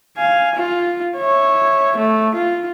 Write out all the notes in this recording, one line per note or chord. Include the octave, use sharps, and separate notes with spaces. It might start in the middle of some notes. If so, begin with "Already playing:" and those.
F5 G#5
F4
C#5 E5
A3
F4